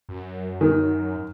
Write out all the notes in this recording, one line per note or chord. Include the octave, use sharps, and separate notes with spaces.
F#2
D#3